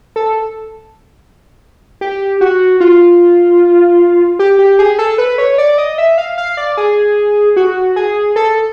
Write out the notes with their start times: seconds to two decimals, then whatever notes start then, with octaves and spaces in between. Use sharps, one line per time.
0.16 A4
2.01 G4
2.41 F#4
2.80 F4
4.39 G4
4.59 G4
4.79 G#4
4.99 A4
5.18 B4
5.38 C#5
5.58 D5
5.78 D#5
5.98 E5
6.18 F5
6.38 F5
6.57 D5
6.77 G#4
7.57 F#4
7.96 G#4
8.36 A4